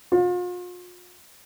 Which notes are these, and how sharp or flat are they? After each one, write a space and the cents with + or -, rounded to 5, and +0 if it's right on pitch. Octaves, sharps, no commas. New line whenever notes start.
F4 +40